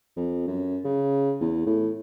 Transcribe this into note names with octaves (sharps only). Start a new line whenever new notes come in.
F2
F#2
C#3
E2
A2